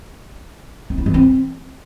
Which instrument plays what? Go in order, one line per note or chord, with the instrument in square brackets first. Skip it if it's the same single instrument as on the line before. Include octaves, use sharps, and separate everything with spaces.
[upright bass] D#4
E4
E3
C4